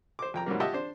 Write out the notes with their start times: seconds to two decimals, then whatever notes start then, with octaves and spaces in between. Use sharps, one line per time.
0.19 C5 D6
0.34 F2 G5 A#5
0.46 G#2 F#3 G3 A#3
0.60 F4 G4 D#5 E5 F#5 A5
0.74 D4 C5